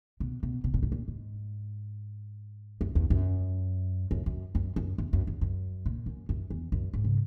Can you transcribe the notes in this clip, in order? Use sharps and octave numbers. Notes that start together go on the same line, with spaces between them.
B2
B2
B2
A#2
G#2
A#2
G#2
F#2
E2
F#2
F#2
F#2
F#2
F#2
E2
F#2
E2
F#2
A#2
F#2
F#2
E2
F#2
G#2
C#3